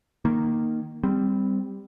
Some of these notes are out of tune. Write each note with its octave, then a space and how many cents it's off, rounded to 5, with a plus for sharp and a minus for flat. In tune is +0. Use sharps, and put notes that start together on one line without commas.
D#3 -15 A#3 +0
G3 +15 C4 -10